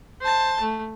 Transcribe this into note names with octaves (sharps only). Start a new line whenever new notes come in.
C5 A5
A3